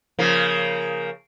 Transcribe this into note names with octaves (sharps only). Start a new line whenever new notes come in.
C#3 F3 A#3